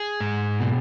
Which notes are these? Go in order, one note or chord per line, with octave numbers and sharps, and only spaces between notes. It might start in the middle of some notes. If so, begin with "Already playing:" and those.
Already playing: G#4
G#2
B2